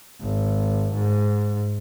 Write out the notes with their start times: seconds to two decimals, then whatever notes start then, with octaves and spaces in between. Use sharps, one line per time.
0.21 G#1
0.93 G#2